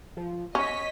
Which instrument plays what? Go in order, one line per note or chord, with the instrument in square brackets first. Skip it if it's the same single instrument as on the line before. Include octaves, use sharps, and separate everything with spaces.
[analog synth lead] F3
[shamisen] C#4 [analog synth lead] C#5 [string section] D#5 B6